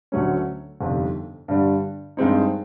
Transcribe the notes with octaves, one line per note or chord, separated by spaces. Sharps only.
D2 D3 F#3 A3 C#4
G1 F2 C3 D#3
G2 D3 G3
G2 D#3 G#3 C4 D#4